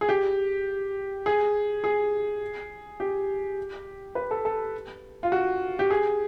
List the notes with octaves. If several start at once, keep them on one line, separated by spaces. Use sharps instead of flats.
G#4
G4
G#4
G#4
G4
B4
A4
A4
F4
F#4
G4
G#4